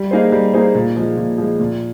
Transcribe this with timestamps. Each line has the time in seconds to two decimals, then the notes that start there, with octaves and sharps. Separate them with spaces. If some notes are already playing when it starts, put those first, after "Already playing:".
Already playing: G3
0.11 A#3 D#4 G#4 C5
0.32 G3
0.53 A#3 D#4 G#4 C5
0.75 A#2
0.96 F3 G#3
1.17 A#2
1.38 F3 G#3
1.60 A#2